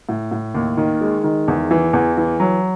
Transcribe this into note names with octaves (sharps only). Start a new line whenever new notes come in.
A2
A2
D#2
D#3
G#3
D#3
E2
E3
E2
E3
F#3